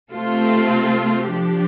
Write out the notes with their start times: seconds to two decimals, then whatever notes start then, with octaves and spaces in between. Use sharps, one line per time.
0.13 C3 A3 C4 F4 A4
1.27 F3 D4 G4